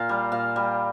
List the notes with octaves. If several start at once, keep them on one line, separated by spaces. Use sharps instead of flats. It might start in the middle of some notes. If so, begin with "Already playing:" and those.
Already playing: A#2 F5
G3
A#2 F5
G3